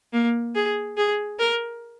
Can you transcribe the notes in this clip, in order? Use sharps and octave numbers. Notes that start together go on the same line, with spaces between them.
A#3
G#4
G#4
A#4